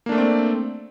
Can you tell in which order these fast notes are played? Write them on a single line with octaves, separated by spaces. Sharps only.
A#3 D4 A3 D5 C4